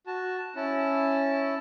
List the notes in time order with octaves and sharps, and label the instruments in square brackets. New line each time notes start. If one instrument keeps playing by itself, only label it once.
[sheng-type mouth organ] F#4 A5
C#4 E4 A5